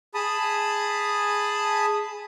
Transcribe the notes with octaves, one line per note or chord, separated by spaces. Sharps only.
G#4 A5 B5 D#6